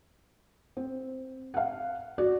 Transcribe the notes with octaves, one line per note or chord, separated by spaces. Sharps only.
C4
F5 F#5
F#4 D5